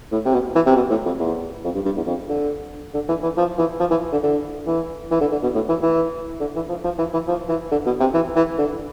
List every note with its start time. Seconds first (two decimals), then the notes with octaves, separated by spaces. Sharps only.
0.12 A2
0.25 C3
0.33 B2
0.55 E3
0.66 C3
0.76 B2
0.91 A2
1.05 F2
1.19 E2
1.64 F2
1.75 G2
1.85 G2
1.97 E2
2.06 F2
2.29 D3
2.94 D3
3.09 E3
3.23 E3
3.37 F3
3.58 E3
3.80 F3
3.91 E3
4.12 D3
4.23 D3
4.67 E3
5.11 E3
5.21 D3
5.32 D3
5.43 B2
5.54 A2
5.69 E3
5.83 E3
6.40 D3
6.56 E3
6.69 F3
6.84 F3
6.99 E3
7.14 E3
7.28 F3
7.49 E3
7.71 D3
7.86 B2
8.00 C3
8.14 E3
8.36 E3
8.58 D3